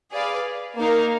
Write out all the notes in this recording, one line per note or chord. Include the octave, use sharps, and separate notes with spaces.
G#4 B4 D5 F5
A#3 D#4 A#4 F5